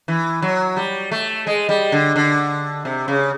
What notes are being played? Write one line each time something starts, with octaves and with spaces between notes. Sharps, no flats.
E3
F#3
G3
A3
G#3
G3
D3
D3
C3
C#3